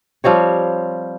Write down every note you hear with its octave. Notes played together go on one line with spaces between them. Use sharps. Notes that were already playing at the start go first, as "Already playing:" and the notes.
F3 G3 C4 C#5